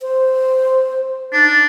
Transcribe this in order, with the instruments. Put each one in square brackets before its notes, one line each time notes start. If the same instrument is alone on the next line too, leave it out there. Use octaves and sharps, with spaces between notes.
[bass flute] C5
[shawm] D4 [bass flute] D#4